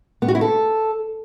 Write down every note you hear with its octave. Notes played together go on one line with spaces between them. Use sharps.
B3
F#4
E4
A4